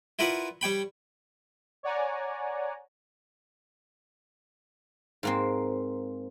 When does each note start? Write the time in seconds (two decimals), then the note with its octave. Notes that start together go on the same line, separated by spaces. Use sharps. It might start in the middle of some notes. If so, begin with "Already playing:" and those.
0.19 E4 F4 A#4 B4 D5 F#5
0.61 G3 C#5 G5 B5
1.83 C#5 D5 F#5 G#5 A#5
5.23 G#2 A#3 C4